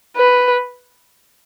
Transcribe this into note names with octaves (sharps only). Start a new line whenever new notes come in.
B4